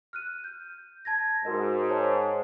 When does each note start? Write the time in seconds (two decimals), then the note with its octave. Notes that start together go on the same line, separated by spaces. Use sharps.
0.13 F6 F#6 D#7
0.44 G6
1.05 A5 G#6 A#6
1.45 G#2 F#4 A#4 D#5
1.89 C5 C#5 A5